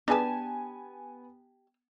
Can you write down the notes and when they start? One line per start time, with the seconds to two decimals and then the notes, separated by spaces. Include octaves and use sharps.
0.08 B3 D4 G4 G#4 B4 G#5 A5